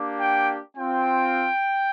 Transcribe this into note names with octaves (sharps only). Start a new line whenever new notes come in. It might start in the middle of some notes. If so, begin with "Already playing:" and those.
Already playing: A#3 D4 G4
G5
C4 F4 G5